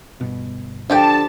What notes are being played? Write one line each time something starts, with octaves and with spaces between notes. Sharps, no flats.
G1 B2
D3 F3 G4 G5 A5